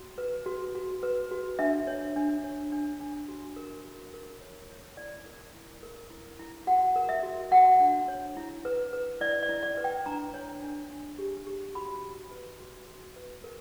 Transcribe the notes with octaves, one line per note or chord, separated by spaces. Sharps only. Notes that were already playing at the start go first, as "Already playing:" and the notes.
Already playing: F#4
B4
F#4
F#4
B4
F#4
D4 E5
C#5
D4
C#5
D4
D4
F#4
A#4
F#4
A#4
C#5
C#5
E4 D5
A#4
E4
A#4
E4
E4
F#4 F#5
A#4
E5
F#4
F#4 F#5
D4
C#5
E4
B4
B4
E4 D5
D5
E4
D5
B4
G5
D4 A#5
C#5
D4
D4
G4
G4
F#4 B5
F#4
B4
F#4
F#4
B4
A#4